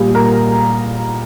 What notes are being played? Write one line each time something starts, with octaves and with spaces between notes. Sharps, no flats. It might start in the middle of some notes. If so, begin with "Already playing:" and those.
Already playing: A#2 G3 G#4
A#4 A#5